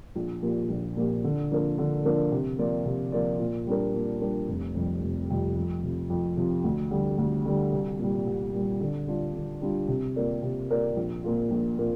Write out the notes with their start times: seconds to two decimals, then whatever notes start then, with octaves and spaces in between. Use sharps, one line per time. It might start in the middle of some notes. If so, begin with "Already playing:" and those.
0.15 A#1
0.42 A#2 F3 A#3 G4
0.70 A#1
0.97 A#2 F3 A#3 G4
1.24 D3
1.51 F3 A#3 D4 A#4
1.78 D3
2.04 F3 A#3 D4 A#4
2.32 C3
2.59 F3 A#3 F4 D5
2.85 C3
3.12 F3 A#3 F4 D5
3.39 A#2
3.67 G3 D4 A#4
3.94 A#2
4.21 G3 D4 A#4
4.48 F1
4.74 F2 C3 G3 C4
5.03 F1
5.29 F2 C3 G3 C4
5.56 F2
5.84 C3 F3
6.10 F2
6.37 C3 F3
6.64 D2
6.91 D3 G3
7.18 D2
7.45 D3 G3
7.73 C2
7.99 A#2 G3
8.26 C2
8.54 A#2 G3
8.80 D3
9.08 G3 D4 F4
9.34 D3
9.62 G3 D4 F4
9.88 C3
10.16 A#3 F4 A#4 D5
10.43 C3
10.70 A#3 F4 A#4 D5
10.97 A#1
11.24 A#2 A#3 F4
11.51 A#1
11.78 A#2 A#3 F4